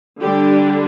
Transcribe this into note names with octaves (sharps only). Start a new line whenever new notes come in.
D3 G3 D4 G4